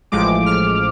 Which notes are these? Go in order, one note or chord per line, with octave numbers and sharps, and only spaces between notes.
A1 A2 F3 G#3 D6
F6